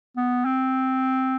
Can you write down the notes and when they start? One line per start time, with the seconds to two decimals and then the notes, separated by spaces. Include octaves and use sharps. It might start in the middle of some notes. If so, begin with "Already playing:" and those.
0.17 B3
0.45 C4